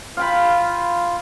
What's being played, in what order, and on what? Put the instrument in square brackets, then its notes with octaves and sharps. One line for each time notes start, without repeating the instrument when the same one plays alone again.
[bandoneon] F4 [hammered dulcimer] F5 G5 B5